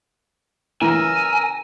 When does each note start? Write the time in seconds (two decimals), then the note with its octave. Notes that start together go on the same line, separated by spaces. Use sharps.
0.81 C#3 E3 A#4 G#5 A#5 E6